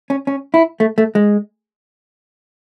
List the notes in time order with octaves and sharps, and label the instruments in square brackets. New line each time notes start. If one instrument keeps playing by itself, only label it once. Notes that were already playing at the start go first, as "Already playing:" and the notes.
[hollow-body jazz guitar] C#4
C#4
E4
A3
A3
G#3